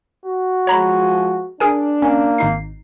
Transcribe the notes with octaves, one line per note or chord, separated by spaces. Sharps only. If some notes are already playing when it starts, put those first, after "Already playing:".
F#4
F3 G#3 C#5 A#5 B5
D4 G#4 A#4 G#5
A#3 C#4
G#1 D#4 C7